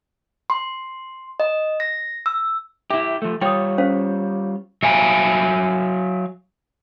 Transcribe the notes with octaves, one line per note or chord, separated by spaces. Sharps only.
C6
D#5
A#6
E6
E4 G4 E5
F3 A3
G3 F4 C#5 G5 D#6
C#4 C5 F5
F#3 E5 F5 G#5